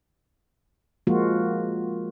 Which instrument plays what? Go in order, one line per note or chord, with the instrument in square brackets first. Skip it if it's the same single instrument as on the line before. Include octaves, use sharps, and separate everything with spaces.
[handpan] F3 G#3 A#3 F4 F#4